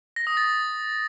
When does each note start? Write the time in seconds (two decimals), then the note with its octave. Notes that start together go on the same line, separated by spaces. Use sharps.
0.16 A#6
0.27 D#6
0.37 A6